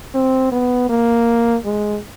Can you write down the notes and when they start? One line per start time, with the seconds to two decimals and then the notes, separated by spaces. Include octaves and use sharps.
0.14 C4
0.52 B3
0.89 A#3
1.65 G#3